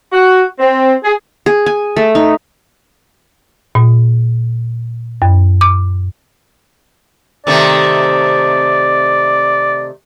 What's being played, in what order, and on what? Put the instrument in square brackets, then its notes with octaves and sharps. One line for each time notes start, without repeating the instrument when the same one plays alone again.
[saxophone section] F#4
C4
G#4
[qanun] G#4
G#5
A3
D#4
[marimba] A#2
F#2
D6
[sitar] C3 D#3 A3 [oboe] D5